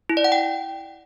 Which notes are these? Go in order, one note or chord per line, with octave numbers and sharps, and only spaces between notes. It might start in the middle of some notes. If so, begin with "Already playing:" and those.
E4
D5
F#5
G5